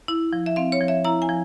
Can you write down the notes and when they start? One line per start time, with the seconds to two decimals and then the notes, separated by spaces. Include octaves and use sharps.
0.08 E4
0.33 F3
0.46 E5
0.56 C4 F5
0.72 C#5
0.81 F3
0.88 E5
1.05 E4 A#5
1.22 G#5
1.29 F3